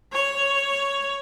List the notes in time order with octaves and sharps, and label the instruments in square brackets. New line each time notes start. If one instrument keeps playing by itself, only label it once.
[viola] C#5